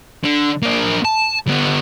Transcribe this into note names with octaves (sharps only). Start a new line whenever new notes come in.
D3
A#3 D4
A5
D3 B3